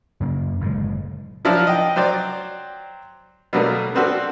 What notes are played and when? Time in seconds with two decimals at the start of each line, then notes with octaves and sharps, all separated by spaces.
0.20 F#2 C#3 A#3
0.60 F#1 A2 D3 G#3
1.45 F3 F#3 D4 E4
1.67 D#5 G5
1.96 F#3 C5 D5 G5
3.53 B2 D3 F#3 G3 A3 A#3
3.95 B3 C4 D4 F#4 A4